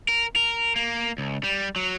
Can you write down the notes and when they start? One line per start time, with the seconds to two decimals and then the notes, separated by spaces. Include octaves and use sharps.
0.08 A#4
0.36 A#4
0.76 A#3
1.18 C#2
1.44 G3
1.76 F#3